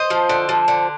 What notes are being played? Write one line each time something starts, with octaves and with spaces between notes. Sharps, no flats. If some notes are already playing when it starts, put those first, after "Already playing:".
Already playing: C5 D#5
F3
D3
F3
D3